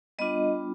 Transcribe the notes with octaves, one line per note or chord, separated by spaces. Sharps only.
G3 B3 D4 F4 D#5